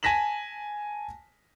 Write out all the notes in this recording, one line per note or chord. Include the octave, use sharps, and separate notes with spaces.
G#5 A5 A#6 B6 E7 F#7